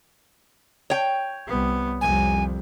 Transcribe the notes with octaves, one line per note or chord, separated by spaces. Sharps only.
C#5 G5
C2 B3
C2 F2 G#5